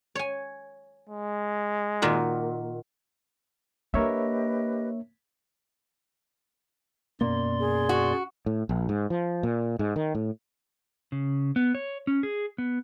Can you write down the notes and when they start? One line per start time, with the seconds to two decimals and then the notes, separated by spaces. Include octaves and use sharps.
0.15 C#5 G#5
1.09 G#3
2.02 A#2 D#3 F#4
3.94 A#3 D4 G4 A#4 B4 C#5 D#5 E5
7.21 F#2 B2 A#3 D5 C6
7.60 G#4
7.89 F#4
8.46 A2
8.69 A#1
8.89 G#2
9.10 F3
9.43 A#2
9.79 G#2
9.96 D#3
10.15 A2
11.12 C#3
11.56 B3
11.75 C#5
12.07 C#4
12.23 G#4
12.58 B3